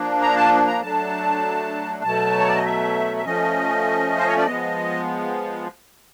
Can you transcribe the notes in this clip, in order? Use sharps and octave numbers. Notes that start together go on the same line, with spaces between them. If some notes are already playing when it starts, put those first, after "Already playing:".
Already playing: F3 A#3 D4
A#5
A5
A#5
F#3 A3 D4 A5
B2 F#3 A3 A5
C#5
D5
D#5
E5
E5
F3 A3 C#4 D#5
C5
C#5
D5
F3 G#3 B3 D#5